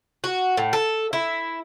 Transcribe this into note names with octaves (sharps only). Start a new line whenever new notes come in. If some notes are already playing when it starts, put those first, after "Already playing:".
F#4
A2
A4
E4